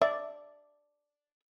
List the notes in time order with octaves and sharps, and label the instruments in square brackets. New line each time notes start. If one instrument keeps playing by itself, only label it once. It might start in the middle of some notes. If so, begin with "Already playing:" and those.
[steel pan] D5 [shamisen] E5